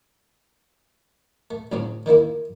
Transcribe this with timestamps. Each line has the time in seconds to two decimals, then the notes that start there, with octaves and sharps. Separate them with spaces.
1.51 A3
1.72 D2 A2 C#3 F#3 C4
2.06 D3 D#3 A#3 E4